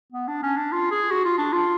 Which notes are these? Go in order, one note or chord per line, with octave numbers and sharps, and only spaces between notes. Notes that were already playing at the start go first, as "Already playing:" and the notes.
B3
D4
C#4
D4
F4
G#4
F#4
F4
D4
F4